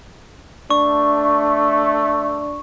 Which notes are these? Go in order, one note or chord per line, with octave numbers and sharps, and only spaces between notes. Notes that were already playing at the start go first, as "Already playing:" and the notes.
A3 D4 C#6